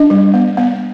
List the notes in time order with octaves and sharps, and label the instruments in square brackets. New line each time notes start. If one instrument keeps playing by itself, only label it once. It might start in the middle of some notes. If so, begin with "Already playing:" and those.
Already playing: [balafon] D4 D#5
G3
B3
B3